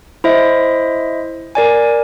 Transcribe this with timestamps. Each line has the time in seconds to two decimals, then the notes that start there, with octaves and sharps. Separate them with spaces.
0.24 E4 C5 D#5 E5
1.55 A#4 D5 G#5